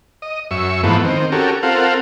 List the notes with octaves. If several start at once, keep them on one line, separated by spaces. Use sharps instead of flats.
D#5
F#2 E5 C#6
G#2 E3 F3 A3 B3
D#3 C4
C#4 F#4 G4 A4 A#4
C4 F4 A4 A#4 F5 F#5